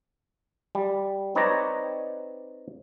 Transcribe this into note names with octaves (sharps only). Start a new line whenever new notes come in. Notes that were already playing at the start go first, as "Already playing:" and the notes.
G3
C4 D#4 B4 C#5 D5 A#5